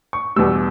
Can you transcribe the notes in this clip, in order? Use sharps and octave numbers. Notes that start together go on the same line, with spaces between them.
C#6
E2 B2 G3 E6